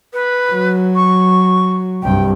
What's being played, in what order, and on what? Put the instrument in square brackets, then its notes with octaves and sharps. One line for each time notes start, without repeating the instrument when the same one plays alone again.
[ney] B4
[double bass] F#3
[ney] C#6
[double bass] C2 G2 [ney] G5